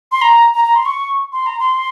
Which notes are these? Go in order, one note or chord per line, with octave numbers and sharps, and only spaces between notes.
C6
A#5
A#5
A#5
C6
C#6
C6
A#5
C6